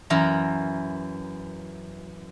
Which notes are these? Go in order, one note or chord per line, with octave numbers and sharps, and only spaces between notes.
F#2 E3 A#4 A#5